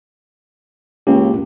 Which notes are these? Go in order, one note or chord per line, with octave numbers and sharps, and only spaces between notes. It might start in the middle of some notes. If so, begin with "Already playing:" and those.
C#2 A#3 C#4 G4